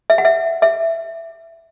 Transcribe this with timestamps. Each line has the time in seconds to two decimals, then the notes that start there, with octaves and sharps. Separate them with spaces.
0.10 E5
0.18 F#5
0.25 E5
0.62 E5